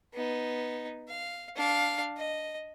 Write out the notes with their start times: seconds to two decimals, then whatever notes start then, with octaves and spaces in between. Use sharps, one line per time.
0.14 B3 D#4
1.08 F5
1.56 D4 F5
2.17 D#5